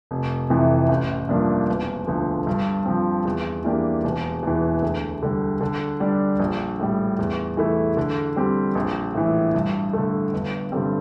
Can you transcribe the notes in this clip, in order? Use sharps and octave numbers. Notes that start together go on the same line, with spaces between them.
F1
F2 C3 E3
A1
G2 F3 A#3 D4
E1
D2 D3 F3
G2
F3 C4
E2
E3 A#3 D4 G4
E1
E2 E3
D2
D3 G3
D3
G3 D4 G4 D5
A#1
A2 G3
E2
E3 A3 E4
D3
G3 C4 G4
A#1
A2 E3
G2
D3 A3
G1
G2 D3 G3 C4